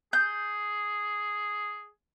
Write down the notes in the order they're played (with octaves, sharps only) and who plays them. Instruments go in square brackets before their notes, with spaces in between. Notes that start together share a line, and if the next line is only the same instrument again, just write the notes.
[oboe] G#4 [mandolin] G6